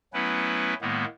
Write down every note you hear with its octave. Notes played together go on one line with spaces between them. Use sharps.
F#3 A3 B3 C#4 E4 B4
A2 D#3 G#3 A#3 B3